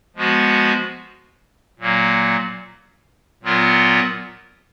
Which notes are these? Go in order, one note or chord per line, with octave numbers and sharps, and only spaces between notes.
F3 G#3 B3 F#4
A#2 F#3 A#3
A#2 F#3 B3 F4 A#4